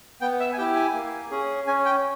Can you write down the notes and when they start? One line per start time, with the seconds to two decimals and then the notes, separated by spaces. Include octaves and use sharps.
0.21 B3 G5
0.40 E5
0.53 G#5
0.58 E4 G4 G5
0.76 G#5
0.94 A#3
1.31 C#4 G#4
1.67 C#4 G#5
1.85 G5